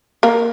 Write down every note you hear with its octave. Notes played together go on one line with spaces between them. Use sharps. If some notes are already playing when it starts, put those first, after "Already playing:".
A#3